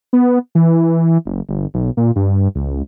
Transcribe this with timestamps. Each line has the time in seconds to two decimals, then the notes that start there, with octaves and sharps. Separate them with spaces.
0.13 B3
0.55 E3
1.25 F#1
1.49 G1
1.74 B1
1.97 A#2
2.16 G2
2.55 C#2